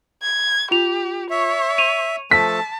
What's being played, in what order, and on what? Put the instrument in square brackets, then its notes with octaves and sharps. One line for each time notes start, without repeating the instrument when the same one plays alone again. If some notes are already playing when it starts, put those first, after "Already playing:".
[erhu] G#6
[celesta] F4 F7 [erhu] G4
[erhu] C#5 [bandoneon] E5
[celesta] D#7 F7
[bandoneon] F3 A3 A4 [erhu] A5 [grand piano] B6